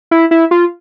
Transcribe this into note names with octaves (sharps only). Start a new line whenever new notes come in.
E4
E4
F4